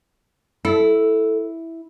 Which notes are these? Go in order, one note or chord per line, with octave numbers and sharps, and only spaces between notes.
E4 A4